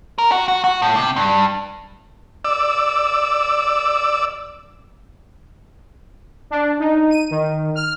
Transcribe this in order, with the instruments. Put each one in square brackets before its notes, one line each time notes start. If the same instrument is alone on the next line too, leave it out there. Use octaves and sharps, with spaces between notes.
[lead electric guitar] A#4
F#4
F#4
F#4
A2
C3
G2
[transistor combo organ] D5 E6
[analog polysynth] D4
D#4
D#7
D#3
F6